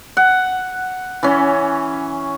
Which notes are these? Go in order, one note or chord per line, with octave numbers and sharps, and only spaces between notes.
F#5
E3 C#4